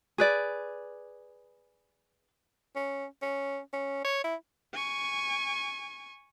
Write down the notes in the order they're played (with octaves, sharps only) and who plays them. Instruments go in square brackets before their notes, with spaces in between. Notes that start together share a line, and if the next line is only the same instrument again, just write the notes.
[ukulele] G#4 B4 D5
[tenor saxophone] C#4
C#4
C#4
C#5
E4
[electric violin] G#5 C#6